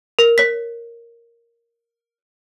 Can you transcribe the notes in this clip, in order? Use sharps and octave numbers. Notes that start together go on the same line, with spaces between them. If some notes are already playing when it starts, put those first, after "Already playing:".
A#4
C#5 B6